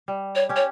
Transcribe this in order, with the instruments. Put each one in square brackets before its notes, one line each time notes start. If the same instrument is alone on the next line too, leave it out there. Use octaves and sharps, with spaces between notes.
[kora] G3
[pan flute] C#5
[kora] C#4 G4
[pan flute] C#5